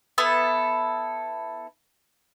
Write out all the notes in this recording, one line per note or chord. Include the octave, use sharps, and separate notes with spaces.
B3 E4 A4